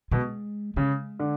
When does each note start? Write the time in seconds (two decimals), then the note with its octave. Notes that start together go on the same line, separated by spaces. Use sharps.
0.11 B2 G#3
0.76 C#3 G#3
1.20 D3